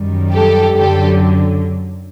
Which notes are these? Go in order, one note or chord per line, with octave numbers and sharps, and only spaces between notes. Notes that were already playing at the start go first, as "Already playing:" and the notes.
Already playing: F#2 D#3 G3
G4 A4
F#2 D3 F#3 G4 A4